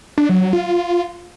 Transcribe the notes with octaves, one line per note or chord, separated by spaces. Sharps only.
D4
F#3
F#3
F4